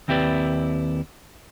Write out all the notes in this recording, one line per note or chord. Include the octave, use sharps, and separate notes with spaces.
D#2 C4 E4 G4 B4 D5